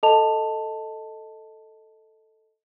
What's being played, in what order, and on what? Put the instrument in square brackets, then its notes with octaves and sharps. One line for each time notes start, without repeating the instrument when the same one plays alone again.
[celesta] A4 D#5 A5 F7